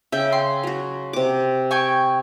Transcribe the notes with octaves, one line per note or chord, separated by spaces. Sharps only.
C#3 E5 G5
C6
F#3 F#4
C3 D6
G5 G#5 C#6